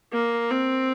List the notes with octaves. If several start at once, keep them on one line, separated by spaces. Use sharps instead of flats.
A#3
C4